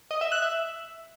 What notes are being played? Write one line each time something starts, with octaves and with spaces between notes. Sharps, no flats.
D#5
E5
F#6
E5